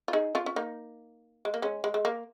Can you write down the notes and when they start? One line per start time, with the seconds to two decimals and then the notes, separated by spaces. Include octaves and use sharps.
0.08 F4
0.13 D#4 G#4
0.35 C#4 F4
0.46 C#4
0.56 A#3 D#4
1.45 G#3
1.54 A#3
1.62 G#3 C#4
1.84 G#3
1.94 G#3
2.05 A#3